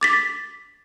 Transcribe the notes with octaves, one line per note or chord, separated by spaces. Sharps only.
D6 A6 B6